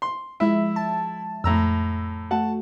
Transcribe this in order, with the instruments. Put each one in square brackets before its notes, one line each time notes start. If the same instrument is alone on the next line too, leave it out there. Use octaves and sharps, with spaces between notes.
[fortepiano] C6
[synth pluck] F3 G#3 E5 [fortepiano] E4
[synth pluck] A5
[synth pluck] F2 [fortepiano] A2 A#5 E6
[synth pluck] A3 F#4 [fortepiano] F#5 A5